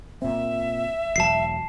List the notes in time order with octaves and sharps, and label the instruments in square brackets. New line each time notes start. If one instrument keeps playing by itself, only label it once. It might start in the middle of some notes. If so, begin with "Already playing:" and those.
[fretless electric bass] A#2 C4 [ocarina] E5
[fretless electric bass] E1 F#3 [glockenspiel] A5 C7